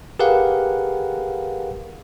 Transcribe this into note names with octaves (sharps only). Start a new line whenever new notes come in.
G4 G#4 A#4 B4 F5 F#5